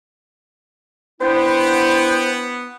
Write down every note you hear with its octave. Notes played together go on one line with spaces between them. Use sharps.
B3 D4 E4 C5 G5